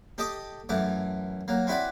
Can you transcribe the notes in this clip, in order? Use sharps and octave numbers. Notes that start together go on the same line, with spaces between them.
G4 A4 D#5 A5 D6 D#6
F#2 E3 A3 D6
F#3 A#3
C4 E4 F#4 B4 D5